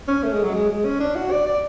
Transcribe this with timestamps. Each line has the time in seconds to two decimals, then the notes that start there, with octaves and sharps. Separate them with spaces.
0.08 C#4
0.23 A3
0.33 G#3
0.43 F#3
0.54 G#3
0.70 G#3
0.85 C#4
1.00 D4
1.16 F#4
1.31 D5
1.46 D5